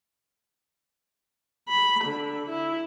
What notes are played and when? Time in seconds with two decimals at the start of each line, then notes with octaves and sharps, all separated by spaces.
1.69 B5
2.04 D3
2.49 E4